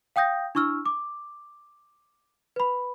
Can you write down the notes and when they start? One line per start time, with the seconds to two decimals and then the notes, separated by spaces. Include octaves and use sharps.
0.16 F5 G5 D#6 G6 A#6
0.55 D4 E4 C#6 E6 F6
0.86 D6
2.56 B4 B5